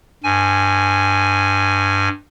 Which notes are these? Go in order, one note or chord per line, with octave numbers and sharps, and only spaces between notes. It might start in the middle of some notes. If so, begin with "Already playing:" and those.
G2 G#5